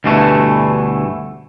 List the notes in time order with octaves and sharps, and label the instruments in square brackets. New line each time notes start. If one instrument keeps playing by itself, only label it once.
[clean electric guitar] D2 G2 B2 E3 A3